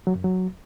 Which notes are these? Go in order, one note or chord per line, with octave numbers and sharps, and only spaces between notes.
F#3
F#2
F#3